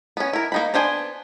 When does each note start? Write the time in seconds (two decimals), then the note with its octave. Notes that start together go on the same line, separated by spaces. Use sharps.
0.17 B3 C#4
0.33 E4 A#4
0.52 A#3 D#4 B5
0.74 B3 D4 C5 G#5